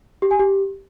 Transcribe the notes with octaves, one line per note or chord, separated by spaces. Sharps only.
G4
G#5
G4